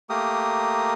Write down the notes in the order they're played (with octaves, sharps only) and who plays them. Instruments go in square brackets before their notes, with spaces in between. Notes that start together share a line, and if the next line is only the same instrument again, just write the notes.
[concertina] A3 A#3 G4 A#4 D#6